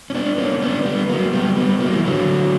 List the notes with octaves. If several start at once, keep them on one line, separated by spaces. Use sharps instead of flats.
C#4
B3 D4
A#3 C#4
B3 D4
G3 B3
F#3 A#3
G3 B3
G3 B3
F#3 A#3
E3
D3 F#3